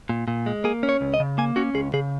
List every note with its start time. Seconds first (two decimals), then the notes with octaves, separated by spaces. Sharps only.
0.09 A#2
0.28 A#2
0.46 G#3
0.64 A#3 G#4
0.83 C#4
0.89 C#5
1.01 C#2
1.14 D#5
1.20 C#3
1.38 A#3 G#5
1.56 C#4 F#4
1.74 C#2 G#4
1.94 C#3 G#4